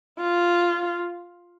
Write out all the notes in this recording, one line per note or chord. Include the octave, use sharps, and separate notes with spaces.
F4